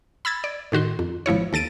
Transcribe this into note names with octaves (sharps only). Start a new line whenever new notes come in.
B5 E6 G#6 A6
D5
A2 D#3 F#4 C6
F2
G#1 F3 E4 C#5
D#2 A4 A6 D7 D#7